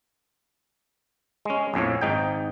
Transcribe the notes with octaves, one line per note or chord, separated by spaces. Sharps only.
G#3 C#4
A#1 F2 A2 C#5
G#1 G#2 D#4 G5